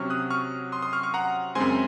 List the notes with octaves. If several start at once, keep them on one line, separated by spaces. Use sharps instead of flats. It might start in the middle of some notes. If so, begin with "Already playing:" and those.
Already playing: C3 F#3 C#4 C#6 F6
D#6 F#6
C#6 F6
C6 D#6
C6 D#6
C#6 F6
C#6 F6
F#5 A#5
F#2 C#3 G#3 C4 G#5 C6